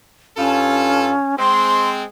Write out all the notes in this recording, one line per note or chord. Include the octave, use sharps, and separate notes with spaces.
G2 C#4 F4 A4
G#3 C4 C6